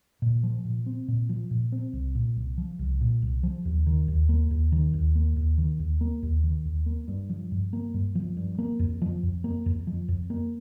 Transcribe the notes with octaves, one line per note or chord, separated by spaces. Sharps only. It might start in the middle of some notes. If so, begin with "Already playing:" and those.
A#2
F3
A#2
C4
A#2
F3
A#2
C4
C2
A#2
C2
F3
C2
A#2
C2
F3
D#2
D#3
D#2
A#3
D#2
D#3
D#2
A#3
D#2
D#3
D#2
A#3
D#2
D#3
D#2
A#3
G2
F3
G2
A#3
G2
F3
G2
A#3
F2
F3
F2
A#3
F2
F3
F2
A#3